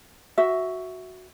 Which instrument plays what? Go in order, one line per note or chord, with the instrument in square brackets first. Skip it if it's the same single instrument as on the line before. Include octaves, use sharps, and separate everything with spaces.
[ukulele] F#4 E5